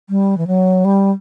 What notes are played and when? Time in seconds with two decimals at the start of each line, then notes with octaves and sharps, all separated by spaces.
0.10 G3
0.38 E3
0.47 F#3
0.85 G3